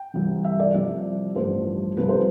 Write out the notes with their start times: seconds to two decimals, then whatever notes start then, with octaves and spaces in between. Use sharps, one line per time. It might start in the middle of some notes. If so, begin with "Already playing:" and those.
Already playing: G5
0.14 C2 C3 E3
0.44 E5
0.60 D5
0.74 C2 C3 F3 D5
1.35 A1 G2 F3 C5
1.97 C2 C3 F3 B4
2.09 C5